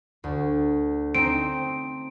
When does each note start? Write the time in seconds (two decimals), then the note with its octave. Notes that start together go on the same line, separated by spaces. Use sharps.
0.24 D2
1.15 C4 D#4 D7